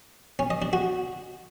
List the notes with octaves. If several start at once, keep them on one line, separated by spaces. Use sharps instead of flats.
C#4
D#5
D4
F#4